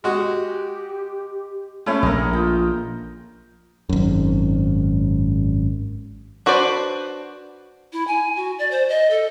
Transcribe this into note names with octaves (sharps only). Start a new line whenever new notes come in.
G#3 F#4 G4
A3 C#4 E4
A#1 A#2 A#4 D#5
F4 G5
G#1 F#2
D4 F#4 B4 C5 D5
E4
G#5
F#4
D5
C5
D#5
A4